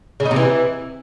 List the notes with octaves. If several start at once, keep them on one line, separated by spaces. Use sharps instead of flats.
C#3
D#4
C3
E3